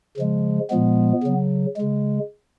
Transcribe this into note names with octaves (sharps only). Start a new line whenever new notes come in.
C#3 F3 G#3
A#2 F3 G#3 B3
C#3 F#3
C#3 G#3